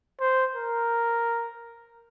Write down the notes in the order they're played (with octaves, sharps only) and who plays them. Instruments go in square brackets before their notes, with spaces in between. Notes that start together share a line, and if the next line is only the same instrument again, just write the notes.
[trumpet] C5
A#4